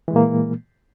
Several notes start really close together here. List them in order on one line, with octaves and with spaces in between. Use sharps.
E3 G#3 A#2 A#3